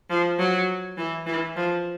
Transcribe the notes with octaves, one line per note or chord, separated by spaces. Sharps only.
F3
F#3
E3
E3
F3